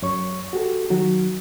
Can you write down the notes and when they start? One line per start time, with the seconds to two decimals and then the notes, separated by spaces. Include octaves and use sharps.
0.02 F#2 C#5 C#6
0.53 F#4 G4 A4
0.90 D#3 F#3 F#4